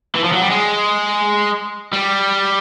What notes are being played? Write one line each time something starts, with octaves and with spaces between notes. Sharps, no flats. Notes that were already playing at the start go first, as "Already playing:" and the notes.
E3
F3
F#3
G3
G#3
G3